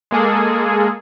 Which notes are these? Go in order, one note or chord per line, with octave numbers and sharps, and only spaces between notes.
G#3 A#3 G#4 A4